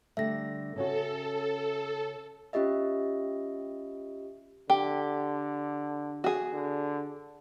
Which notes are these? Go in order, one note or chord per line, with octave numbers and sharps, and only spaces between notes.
D3 G3 A3 E5 A#6
C#3 C#4 F#4 A4
C#4 F4 G4 D#5 E5
D3 G4
F#4 G#4
D3